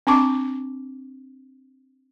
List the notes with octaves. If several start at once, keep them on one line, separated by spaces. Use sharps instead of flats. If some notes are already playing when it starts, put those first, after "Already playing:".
C4 D4 A5 C#6 D6